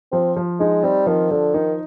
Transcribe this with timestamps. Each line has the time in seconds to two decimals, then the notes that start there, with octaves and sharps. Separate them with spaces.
0.12 F3 C4
0.37 F3
0.60 G#3 D#4
0.83 G3 C4
1.07 D#3 F3
1.31 D3 F3
1.54 D#3 D#4